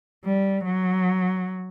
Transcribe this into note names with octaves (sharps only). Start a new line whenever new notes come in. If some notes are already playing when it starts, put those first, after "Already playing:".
G3
F#3